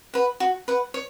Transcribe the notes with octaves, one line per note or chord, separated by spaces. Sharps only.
B4 F#5
F#4
B4 F#5
C#5